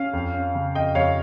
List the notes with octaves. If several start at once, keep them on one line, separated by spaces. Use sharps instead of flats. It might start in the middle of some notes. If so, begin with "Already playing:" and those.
Already playing: C#4 F5
F2
C#4
C#3
F2 D#5 G5
F2 C#5 F5